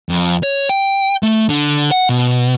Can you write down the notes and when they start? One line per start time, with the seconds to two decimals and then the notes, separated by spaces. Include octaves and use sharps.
0.09 F2
0.43 C#5
0.69 G5
1.23 A3
1.49 D3
1.91 F#5
2.09 B2